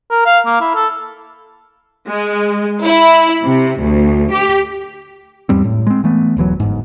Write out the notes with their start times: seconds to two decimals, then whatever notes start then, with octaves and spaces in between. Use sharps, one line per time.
0.11 A#4
0.26 F5
0.46 A#3
0.61 E4
0.75 A4
2.06 G#3
2.84 E4
3.43 C3
3.82 D2
4.31 G4
5.49 E2 G#2 G3 C4
5.64 A2
5.87 G#3 C4
6.04 E3 A3 B3
6.37 E1 B1 E3 F#3
6.60 G1 G#2